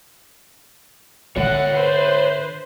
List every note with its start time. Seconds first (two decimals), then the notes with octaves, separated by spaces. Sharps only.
1.37 D3 C#5 E5 F#5
1.72 B4 C5